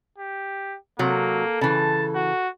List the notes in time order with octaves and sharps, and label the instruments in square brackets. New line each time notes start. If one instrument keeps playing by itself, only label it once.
[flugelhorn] G4
[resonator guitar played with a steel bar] C3 F#3 [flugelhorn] A#3 [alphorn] A4
[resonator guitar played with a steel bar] C#3 E3 [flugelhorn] A5
[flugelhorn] F#4